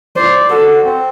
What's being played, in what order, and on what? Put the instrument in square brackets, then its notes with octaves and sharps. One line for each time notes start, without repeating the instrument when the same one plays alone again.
[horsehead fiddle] C5 [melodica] D5
[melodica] F#4 [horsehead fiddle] A4
[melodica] C4